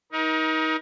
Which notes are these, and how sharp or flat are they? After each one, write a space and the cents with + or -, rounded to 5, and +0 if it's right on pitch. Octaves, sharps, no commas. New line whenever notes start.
D#4 +25 A#4 +40